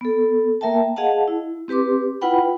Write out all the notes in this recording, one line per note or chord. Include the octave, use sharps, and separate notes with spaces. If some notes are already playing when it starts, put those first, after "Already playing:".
B3 A4
A#3 A#4 E5 G5 A5
G#4 D#5 F5 F#5 A5
E4
C4 G4 B4 C6 D6
E4 F4 B4 F#5 G5 B5